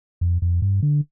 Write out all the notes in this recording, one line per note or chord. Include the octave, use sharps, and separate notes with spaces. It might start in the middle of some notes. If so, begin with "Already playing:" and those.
F2
F2
G2
D3